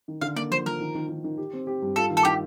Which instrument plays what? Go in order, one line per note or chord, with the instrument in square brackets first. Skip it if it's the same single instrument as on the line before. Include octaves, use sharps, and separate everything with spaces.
[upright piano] D#3
[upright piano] D3 [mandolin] F5
[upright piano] A#3 [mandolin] D5
[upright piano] F3 [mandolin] C5
[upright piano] F3 [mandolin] A#4
[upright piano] D#3
D#3
D#3
D#3
G4
C4
G4
G2
[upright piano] F4 [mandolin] A4
[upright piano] D#3
[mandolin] A4
[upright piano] D#3 [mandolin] G4